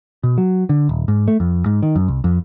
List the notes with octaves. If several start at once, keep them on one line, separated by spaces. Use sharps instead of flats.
B2
F#3
D3
D#1
G#2
A3
F2
G#2
D#3
F#2
C2
F2